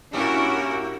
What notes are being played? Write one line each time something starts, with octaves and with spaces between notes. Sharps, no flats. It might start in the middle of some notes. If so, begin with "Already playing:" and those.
A2 C#4 D4 E4 F#4 G4 A#4